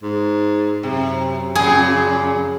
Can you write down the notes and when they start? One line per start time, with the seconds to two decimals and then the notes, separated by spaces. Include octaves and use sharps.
0.03 G#2
0.83 F#2 C3
1.55 F2 A#2 C#3 G#4